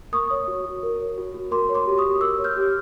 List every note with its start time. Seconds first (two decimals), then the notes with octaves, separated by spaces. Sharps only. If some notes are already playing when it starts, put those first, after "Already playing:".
0.13 A#4 C#6 D#6
0.31 C#5
0.48 F#4
0.65 F#4
0.83 A#4
1.00 C#5
1.18 F#4
1.34 F#4
1.51 A#4 C6 D6
1.69 C#5
1.75 C6 D6
1.86 G4
1.98 C#6 D#6
2.04 G4
2.21 A#4 D6 E6
2.38 C#5
2.44 F6 G6
2.56 G4